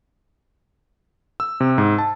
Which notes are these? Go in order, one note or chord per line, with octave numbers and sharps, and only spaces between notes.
E6
C3
G#2
A5